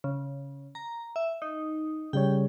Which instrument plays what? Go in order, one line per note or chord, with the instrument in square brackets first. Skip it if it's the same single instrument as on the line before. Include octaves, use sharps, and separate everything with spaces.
[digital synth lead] C#3
A#5
E5
D#4
[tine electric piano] C#3 G3 C#5 [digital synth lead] G5